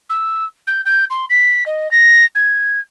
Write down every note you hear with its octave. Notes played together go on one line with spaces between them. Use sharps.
E6
G6
G6
C6
B6
D#5
A#6
G#6